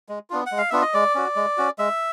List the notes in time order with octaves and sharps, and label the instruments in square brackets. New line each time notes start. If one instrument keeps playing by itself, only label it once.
[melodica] G#3
B3 D4 F4
F#5
G#3
F5
B3 D4 F4 E5
D#5
G#3 D5
C#4 F#4
G#3
C#4 F#4
G#3 E5